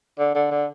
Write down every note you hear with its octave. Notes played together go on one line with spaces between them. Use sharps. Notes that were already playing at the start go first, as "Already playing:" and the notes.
D3
D3
D3